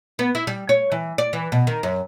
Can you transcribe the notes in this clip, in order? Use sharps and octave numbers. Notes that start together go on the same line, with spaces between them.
B3
E4
G3
C#5
E3
D5
E3
B2
D#3
F#2